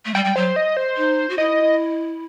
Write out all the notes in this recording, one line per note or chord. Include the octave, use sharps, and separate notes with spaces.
A3
G3 G5
G3
F#3 C5
D#5
C5
D#4
F#4
E4 D#5